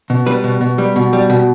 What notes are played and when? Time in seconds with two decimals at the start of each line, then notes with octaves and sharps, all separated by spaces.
0.10 B2
0.27 G3 B4
0.44 B2
0.61 B2
0.78 G3
0.96 B2
1.13 G3
1.30 B2